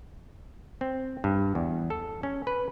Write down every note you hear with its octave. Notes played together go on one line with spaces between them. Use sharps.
C4
G2
E2
A4
C#4
B4